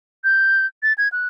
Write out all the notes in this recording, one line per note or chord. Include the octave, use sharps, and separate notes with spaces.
G6
A6
G#6
F#6